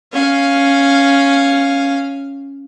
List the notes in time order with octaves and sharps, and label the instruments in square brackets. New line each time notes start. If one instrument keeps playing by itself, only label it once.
[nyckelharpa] C#4 F5